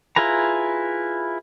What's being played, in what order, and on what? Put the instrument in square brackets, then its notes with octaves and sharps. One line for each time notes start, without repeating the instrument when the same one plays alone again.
[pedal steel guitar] E4 F4 G#4 B4 A#5